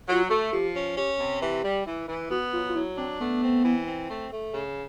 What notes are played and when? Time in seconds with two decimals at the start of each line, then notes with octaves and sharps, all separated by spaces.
0.09 F#3 F4
0.23 F#4
0.30 A3
0.52 F3 G4
0.76 C#4
0.97 C#4 G4
1.19 C3
1.42 E3 G4
1.65 G3
1.86 E3
2.08 E3
2.31 B3 F#4
2.53 F#3 F4
2.69 F4
2.75 F#3 E4
2.97 C4 D4
3.20 A3 B3
3.43 C4
3.64 E3
3.87 C4
4.09 A3
4.31 A3
4.54 C#3